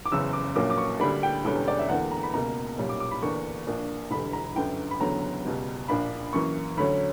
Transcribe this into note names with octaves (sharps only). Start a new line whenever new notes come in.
D6
F#1 E2 C#3 E6
D6
A#1 A#2 F#3 A#3 D6
D6
C#6
D2 D3 G3 A#3 D4 B5
G5
E1 E2 D3 G3 C#4
D5
E5
E2 D3 A#3 F#5
A#5
B5
C#2 B2 A#3 A#5
B1 A#2 G3 C#4
D6
D6
B5
E2 D3 A#3 D4 C#6
A#1 A#2 A#3 D4
E1 E2 D3 G3 B5
A#5
G1 F#2 D3 G5
B5
F#1 E2 D3 F#3 B3 A#5
C#2 B2 G3
A#1 A#2 A#3 D4 B5
F#2 E3 A#3 C#6
D2 D3 F#3 C#4 B5